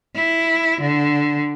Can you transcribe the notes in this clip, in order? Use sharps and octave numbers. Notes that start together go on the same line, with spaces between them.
E4
D3